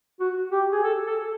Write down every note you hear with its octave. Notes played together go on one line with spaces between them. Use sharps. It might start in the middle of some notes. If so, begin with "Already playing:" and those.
F#4
G4
G#4
A4
A4